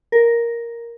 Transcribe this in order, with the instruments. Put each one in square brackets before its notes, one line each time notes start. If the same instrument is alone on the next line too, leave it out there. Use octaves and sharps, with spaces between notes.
[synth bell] A#4